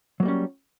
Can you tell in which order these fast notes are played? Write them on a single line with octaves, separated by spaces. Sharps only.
F#3 A#3 G3 C#4